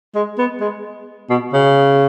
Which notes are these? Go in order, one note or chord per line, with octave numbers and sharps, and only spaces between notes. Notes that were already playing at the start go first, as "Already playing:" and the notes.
G#3
B3
G#3
B2
C#3